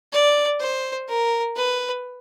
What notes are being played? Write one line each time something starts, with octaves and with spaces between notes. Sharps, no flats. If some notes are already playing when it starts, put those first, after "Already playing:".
D5
C5
A#4
B4